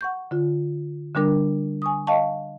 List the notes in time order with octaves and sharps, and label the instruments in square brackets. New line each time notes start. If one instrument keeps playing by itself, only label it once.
[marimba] F#5 C#6 G6
D3 F4
D3 G3 D4 A#4
G#5 C#6 D#6
D#5 F5 G5 A5 C#6